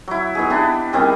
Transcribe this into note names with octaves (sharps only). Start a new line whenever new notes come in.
F#3 E4
B3 D#4 G#4
B3 D4 E4 G4
D#3 G3 C4 G#4